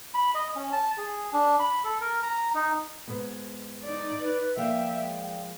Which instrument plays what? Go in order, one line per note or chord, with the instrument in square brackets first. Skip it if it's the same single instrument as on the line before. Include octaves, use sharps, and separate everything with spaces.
[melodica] B5
D#5
C#4
A5
G#4
D4
B5
A4
A#4
A#5
D#4
[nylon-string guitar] G#2 B3
[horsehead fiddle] D#4 D5
[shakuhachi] B4
[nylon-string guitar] F3 A#3 [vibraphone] D5 F5 [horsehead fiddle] E5 [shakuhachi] G5
[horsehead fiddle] G#3